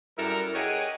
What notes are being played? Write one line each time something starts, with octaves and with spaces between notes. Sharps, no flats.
F#2 G3 E4 A4 A#4
G4 G#4 C#5 D#5 F#5 G#5